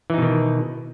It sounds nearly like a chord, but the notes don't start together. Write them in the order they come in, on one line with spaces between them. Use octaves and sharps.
E3 D#4 B2 D#3